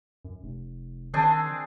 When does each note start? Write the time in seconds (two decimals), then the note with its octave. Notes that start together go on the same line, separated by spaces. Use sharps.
0.25 F#2
0.43 F1
1.14 D#3 C4 D4 G#4